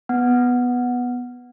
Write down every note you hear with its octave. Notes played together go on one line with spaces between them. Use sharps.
B3